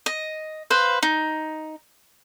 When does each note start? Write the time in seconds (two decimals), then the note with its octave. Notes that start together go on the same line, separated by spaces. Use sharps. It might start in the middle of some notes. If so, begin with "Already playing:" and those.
0.06 D#5
0.70 B4 C5 F5
1.03 D#4